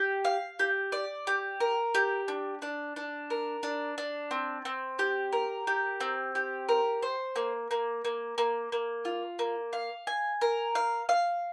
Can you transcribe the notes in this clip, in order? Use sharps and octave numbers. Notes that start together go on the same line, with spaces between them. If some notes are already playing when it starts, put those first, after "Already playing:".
Already playing: G4
F5
G4
D5
G4
A#4
G4
D4
D4
D4
A#4
D4
D4
C4
C4
G4
A#4
G4
C4
G4
A#4
C5
A#3
A#3
A#3
A#3
A#3
F4
A#3
F5
G#5
A#4
F5
F5